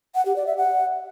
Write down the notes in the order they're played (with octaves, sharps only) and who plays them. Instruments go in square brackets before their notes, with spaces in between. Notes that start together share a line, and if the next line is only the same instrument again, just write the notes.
[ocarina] F#5
G4
D5
E5
F#5